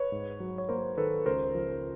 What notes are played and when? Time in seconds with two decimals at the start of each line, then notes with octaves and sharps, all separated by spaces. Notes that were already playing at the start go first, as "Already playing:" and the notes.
Already playing: B4 C#5
0.12 G#2
0.40 F#3
0.58 C#5
0.69 A#3 A#4 C5
0.98 D#3 A4 B4
1.26 C#2 A#4 C5
1.55 F3